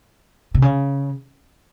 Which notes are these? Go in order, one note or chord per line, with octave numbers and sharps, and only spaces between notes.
C3
C#3